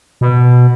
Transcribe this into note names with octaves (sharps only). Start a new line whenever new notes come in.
B2